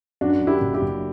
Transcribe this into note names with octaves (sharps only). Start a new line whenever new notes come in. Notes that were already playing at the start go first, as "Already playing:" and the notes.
F#2 D4 F#4
F#2
E4 G4
F#1
E4 G4
F#1